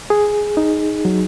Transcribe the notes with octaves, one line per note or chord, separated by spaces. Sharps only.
G#4
D#4
F#3